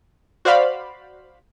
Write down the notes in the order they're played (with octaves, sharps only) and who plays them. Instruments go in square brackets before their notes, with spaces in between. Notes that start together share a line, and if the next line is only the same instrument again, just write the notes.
[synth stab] F#4 C5 D5 F5 B5